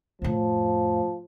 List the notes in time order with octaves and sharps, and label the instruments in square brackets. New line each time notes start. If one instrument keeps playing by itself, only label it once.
[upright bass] F2 A2 [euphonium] F3